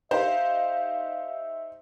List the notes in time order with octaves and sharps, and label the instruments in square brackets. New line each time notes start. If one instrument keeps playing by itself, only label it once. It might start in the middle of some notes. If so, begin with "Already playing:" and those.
[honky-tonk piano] D#4 G4 C5 [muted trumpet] E5 [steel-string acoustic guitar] F5